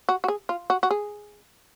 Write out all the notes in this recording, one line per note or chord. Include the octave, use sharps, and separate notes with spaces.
F#4
F#4
G#4
F4
F#4
F#4
G#4